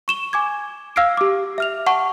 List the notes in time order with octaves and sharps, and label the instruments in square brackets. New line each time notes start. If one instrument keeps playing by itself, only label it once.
[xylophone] C#6 E7 G7
G#5 D6 G#6
F5 E6 F6 G#6 C7 D7
G4 D6
E5 F6 F7
F#5 A5 C#6